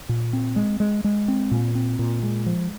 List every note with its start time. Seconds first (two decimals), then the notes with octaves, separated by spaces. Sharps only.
0.09 A#2
0.33 C4
0.56 G#3
0.80 G#3
1.04 G#3
1.28 C4
1.51 A#2
1.75 C4
1.99 A#2
2.23 G#3
2.46 F3